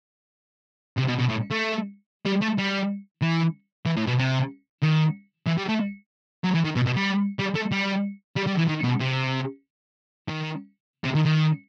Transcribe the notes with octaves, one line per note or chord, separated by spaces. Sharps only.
C3
B2
B2
A2
A3
G3
A3
G3
E3
E3
A2
B2
C3
D#3
E3
G3
A3
F#3
E3
D#3
B2
B2
G3
G3
A3
G3
G3
G3
E3
D#3
B2
C3
D#3
C3
D#3
D#3